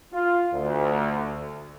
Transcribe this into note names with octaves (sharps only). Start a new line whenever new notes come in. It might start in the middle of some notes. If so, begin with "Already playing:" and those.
F4
D2